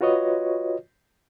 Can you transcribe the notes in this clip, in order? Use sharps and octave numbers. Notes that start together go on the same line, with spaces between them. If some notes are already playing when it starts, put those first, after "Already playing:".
F4 F#4 B4 C#5 D#5